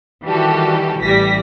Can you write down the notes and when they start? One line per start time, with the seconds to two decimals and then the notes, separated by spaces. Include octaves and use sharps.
0.23 D#3 E3 G3 F#4 G4 A4
1.00 A1 E3 G3 A#6 B6